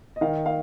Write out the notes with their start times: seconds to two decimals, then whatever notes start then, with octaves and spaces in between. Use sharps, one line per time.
0.16 D#5
0.21 D#3 F5
0.46 F5